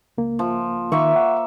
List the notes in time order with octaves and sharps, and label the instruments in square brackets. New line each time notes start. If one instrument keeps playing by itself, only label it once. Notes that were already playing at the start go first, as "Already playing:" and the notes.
[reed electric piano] C#2 A#3
[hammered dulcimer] F3
[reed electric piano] D#3 [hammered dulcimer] A#3 E5 C#6
[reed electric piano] F#5